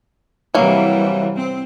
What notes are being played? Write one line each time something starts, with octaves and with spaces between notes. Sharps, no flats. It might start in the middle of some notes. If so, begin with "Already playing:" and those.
C3 E3 F#3 G3 A#3
C4